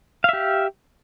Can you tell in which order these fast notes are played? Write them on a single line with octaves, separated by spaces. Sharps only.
F5 E5 G4